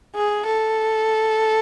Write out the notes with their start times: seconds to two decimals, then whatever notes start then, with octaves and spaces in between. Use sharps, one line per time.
0.15 G#4
0.45 A4